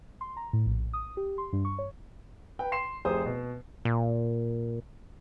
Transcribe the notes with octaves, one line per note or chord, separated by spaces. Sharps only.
C6
A#5
A2
A#1
D#6
G4
C6
G2
C#6
C#5
B4 G5
C6 C7 E7
F1 G4 G#4 C5 D#6
B2
A#2